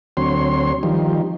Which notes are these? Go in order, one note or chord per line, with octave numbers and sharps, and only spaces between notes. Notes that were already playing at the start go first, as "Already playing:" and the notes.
D2 F#3 C4 C#5 C6
D#3 F3 G3